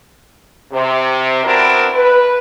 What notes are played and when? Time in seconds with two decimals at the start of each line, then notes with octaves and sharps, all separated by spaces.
0.73 C3
1.44 B3 C4 D4 E4 F#4 A#4
1.95 B4